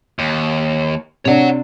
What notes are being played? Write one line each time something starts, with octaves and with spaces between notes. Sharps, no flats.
D#2
C3 D4 C#5 F#5